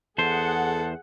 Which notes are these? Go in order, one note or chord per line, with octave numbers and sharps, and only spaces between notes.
E2 G#4 A4 C5 F#5